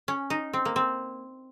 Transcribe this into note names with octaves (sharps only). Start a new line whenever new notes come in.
C#4
D#4
C4
A#3
C4